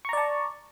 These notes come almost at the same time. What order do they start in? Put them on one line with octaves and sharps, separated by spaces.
C#6 A#5 D5 A5